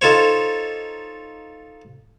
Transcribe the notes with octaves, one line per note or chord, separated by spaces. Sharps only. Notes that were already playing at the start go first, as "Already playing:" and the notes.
D#4 F4 A4 C5 C#5